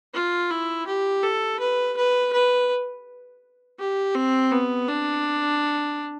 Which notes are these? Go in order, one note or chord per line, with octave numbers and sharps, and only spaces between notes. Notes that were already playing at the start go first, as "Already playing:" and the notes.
F4
E4
G4
A4
B4
B4
B4
G4
C4
B3
D4